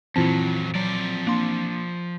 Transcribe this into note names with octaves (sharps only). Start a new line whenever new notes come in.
F2 A#2 E3 F#3 C4 E4 F4 A5
F3 F#3 D5
A#3 D4 C6